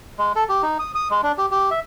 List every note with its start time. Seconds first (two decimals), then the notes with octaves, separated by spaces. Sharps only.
0.18 G#3
0.36 A4
0.49 G4
0.63 D#4
0.79 D#6
0.95 D#6
1.10 G#3
1.23 D4
1.38 G4
1.51 G4
1.71 E5